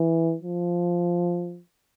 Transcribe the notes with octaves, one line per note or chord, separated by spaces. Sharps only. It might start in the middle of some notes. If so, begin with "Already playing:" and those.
Already playing: E3
F3